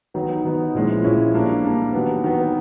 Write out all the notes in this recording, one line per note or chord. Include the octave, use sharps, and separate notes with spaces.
D#3 F#3 B3 D#4
D#3 F#3 B3 D#4
A#2 F3 G#3 C#4 E4
A#2 F3 G#3 C#4 E4
G3 A#3 D4
G3 A#3 D4
D#3 F#3 B3
D#3 F#3 B3